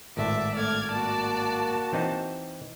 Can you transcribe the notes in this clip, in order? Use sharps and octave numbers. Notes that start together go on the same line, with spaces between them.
G#1 A2 D5 E5
A3 D5 F6 G#6
A#3 F#4 A5
E3 C4 D#4